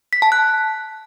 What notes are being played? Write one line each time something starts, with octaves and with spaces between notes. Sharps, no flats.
B6
A5
F#6